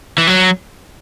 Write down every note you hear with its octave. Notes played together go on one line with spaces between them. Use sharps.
E3
F#3